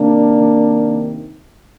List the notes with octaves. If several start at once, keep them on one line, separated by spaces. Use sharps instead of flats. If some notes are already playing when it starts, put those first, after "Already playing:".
Already playing: C3 D#3 A#3 D4
C3 D#3